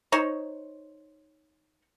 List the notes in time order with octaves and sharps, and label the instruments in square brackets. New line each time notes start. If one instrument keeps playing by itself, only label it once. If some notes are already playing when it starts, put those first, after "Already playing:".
[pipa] D#4 C5 C#5